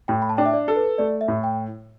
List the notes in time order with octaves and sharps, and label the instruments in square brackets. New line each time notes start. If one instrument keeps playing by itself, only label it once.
[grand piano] A2 [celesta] G5
[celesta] B5
A5
[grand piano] D4 [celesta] G5
[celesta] E5
D5
[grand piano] A4
[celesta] B4
[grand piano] A3 [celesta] D5
[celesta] E5
[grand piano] A2
[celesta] G5